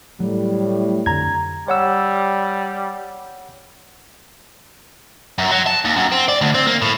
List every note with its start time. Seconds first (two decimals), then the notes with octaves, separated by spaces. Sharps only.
0.20 A2 F#3 G3
1.06 F2 D3 A#5 G#6
1.68 G3 C#5 F#5 E6
5.38 F#2
5.51 F#3
5.67 A5
5.85 D#2
5.96 F#2
6.12 C4
6.29 D5
6.41 D2
6.54 C4
6.67 A#3
6.82 A2